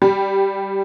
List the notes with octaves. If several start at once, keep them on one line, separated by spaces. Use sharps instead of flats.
G3